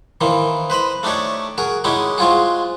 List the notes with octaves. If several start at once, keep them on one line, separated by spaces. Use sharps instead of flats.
D#3 E3 A#3 C4
B4 C5 D#5 B5
A3 D4 D#4 G4 C#5
F#4 G#4 A#4
G#3 C#4 D#4 E4 F#4 G4
G#3 C4 F4 F#4 G#4